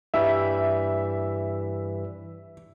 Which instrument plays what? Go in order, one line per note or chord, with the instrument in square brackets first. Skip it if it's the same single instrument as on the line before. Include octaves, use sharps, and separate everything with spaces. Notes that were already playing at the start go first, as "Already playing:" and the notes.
[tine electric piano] G2 E3 G3 [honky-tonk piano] E5